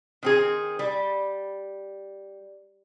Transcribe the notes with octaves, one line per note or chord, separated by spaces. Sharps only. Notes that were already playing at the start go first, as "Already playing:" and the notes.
D#3 C4 G#4
G3